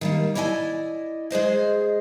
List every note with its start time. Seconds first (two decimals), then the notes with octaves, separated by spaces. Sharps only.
0.01 D#3 G3 A#3
0.35 E4 D5 D#5 F5 G#5
1.31 G#3 G#4 C5 D#5